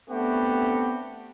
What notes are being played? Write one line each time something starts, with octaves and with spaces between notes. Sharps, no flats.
A3 B3 C4 D4 F#4 G4